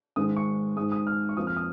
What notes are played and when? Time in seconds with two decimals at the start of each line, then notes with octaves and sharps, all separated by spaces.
0.16 G#2 D#3 G#3 D#6
0.37 C#6
0.76 G#2 G#3 D#6
0.92 D#6
1.07 F6
1.29 C#6
1.37 F2 F3 A#3 D#6
1.47 F6
1.57 D#6